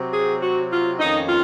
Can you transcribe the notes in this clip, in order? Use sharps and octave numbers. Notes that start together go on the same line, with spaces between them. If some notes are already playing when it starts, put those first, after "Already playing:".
Already playing: C3 F#3 C4
G#4
F#4
F4
F2 D#3 A#3 C#4 D#4
F4